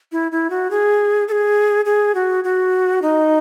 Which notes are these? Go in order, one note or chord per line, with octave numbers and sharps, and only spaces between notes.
E4
E4
F#4
G#4
A4
G#4
G#4
F#4
F#4
D#4